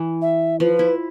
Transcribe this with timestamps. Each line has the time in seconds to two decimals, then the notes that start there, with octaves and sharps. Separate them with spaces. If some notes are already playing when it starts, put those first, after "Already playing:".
Already playing: E3
0.22 E5
0.60 F3 B4
0.79 E4